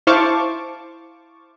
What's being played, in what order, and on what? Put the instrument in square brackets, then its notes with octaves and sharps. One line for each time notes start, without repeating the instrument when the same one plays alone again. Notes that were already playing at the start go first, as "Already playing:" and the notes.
[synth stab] E4 C5 F5 A5 C#6 D6